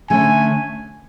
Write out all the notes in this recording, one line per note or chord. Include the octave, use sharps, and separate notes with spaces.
D3 A3 C#4 G#5